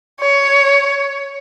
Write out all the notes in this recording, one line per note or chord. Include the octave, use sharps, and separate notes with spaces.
C#5